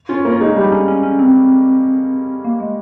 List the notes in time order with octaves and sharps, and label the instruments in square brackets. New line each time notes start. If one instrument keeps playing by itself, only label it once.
[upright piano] C#4 [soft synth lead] F4
[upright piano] A#3
[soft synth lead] F4
[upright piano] G#3 [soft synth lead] D#4
[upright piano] G3 [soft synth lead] D#4
[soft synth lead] C#4
C#4
C#4
C4
A#3
G#3